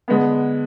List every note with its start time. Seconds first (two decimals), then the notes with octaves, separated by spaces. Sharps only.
0.08 D3 G#3 B3